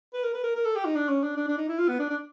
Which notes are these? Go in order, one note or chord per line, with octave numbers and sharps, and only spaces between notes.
B4
A#4
B4
A#4
A#4
A4
G4
D#4
D4
C#4
D4
D4
D4
D#4
E4
F4
B3
D4
D4